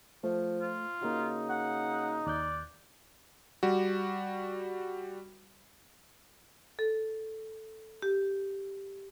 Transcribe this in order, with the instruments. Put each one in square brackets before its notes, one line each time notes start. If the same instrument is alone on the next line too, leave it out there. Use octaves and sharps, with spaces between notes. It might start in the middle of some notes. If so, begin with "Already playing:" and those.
[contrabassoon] F3 [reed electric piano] A3
[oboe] F4
[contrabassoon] C#3 [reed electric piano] A#3 F#4 [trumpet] D#4
[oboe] F#5
[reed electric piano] D#2 F#6 G6 [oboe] D5
[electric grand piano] G3 F#4
[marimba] A4
G4